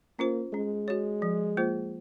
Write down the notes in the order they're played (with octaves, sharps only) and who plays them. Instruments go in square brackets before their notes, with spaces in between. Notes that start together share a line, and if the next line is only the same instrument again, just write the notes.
[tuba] A#3 [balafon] C#4 F4 C5
[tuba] G#3 [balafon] C#4
[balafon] F#4 C#5
F3
A#3 F4 C5